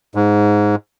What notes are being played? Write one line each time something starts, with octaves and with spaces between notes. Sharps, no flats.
G#2